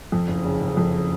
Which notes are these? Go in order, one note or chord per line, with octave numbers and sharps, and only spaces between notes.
F2
F#1
C#3
F#1
F2